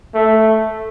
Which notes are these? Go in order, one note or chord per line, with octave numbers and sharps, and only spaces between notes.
A3